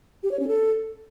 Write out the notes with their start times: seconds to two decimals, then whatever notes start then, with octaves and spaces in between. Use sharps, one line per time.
0.23 G4
0.31 C#5
0.40 C#4
0.48 A4